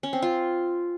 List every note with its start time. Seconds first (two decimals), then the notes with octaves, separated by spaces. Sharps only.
0.03 C#4
0.13 C4
0.22 F4